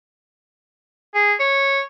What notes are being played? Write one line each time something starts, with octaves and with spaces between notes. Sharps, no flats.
G#4
C#5